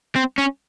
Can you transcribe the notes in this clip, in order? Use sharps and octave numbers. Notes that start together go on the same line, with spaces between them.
C4
C#4